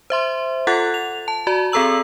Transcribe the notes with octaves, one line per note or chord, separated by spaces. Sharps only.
C5 E5 C6
F4 A4 F#5 F#6 A6
F7
A5
F#4 D5 A#5
C4 G#4 A4 A#5 E6 F#7